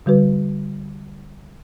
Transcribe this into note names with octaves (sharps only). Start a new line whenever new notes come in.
D3 G3 F#4 B4